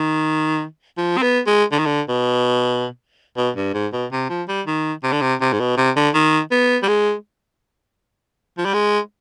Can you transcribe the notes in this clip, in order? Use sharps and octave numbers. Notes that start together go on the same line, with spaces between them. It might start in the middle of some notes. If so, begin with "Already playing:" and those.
Already playing: D#3
F3
C4
B3
G#3
D3
D#3
D3
B2
B2
G2
G#2
B2
C3
F3
G3
D#3
C3
D3
C3
C3
G#2
B2
C3
D3
D#3
B3
G3
G#3
F3
G3
G#3